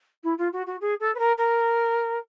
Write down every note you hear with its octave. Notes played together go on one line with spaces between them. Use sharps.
E4
F4
F#4
F#4
G#4
A4
B4
A#4
A#4